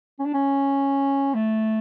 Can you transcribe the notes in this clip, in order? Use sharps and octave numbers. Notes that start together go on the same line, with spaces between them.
C#4
D4
C#4
A3